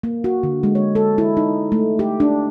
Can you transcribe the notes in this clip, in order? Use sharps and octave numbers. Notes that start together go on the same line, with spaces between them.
A#3
F#4
D3
G#3
C#5
A4
E4
D#4
A3
G4
D4